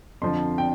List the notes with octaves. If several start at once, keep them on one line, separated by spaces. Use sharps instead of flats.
F2 D3 F3 C6
G5